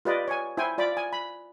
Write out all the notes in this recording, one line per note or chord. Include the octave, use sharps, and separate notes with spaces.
F4 G4 B4 D5 D#5
C#5 G#5
E4 C5 G5 G#5
F4 D5 B5 D6
G#5
B5